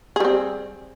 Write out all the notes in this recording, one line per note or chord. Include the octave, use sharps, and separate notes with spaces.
G3 C4 G#4